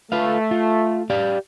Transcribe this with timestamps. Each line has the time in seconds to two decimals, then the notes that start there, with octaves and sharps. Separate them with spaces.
0.12 A3 F4 B4 F5
0.51 F4
1.10 G4 D5 F5